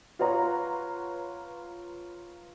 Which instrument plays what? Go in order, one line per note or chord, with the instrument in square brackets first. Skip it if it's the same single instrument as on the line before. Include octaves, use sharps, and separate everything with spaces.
[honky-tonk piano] F4 B4 C#5 F#5 A#5